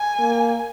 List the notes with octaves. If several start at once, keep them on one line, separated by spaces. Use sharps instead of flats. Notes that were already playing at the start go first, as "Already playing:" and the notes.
Already playing: G#5
A#3